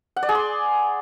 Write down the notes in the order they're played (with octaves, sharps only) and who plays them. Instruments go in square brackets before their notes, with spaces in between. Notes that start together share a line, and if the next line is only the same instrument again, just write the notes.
[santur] F#5
D5
G#4
C6